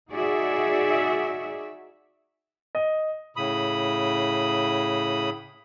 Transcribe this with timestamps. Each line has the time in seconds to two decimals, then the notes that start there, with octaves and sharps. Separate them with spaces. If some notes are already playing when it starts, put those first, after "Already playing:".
0.11 D#4 F#4 G#4 D5 E5
2.75 D#5
3.36 A2 C#3 B5 D#6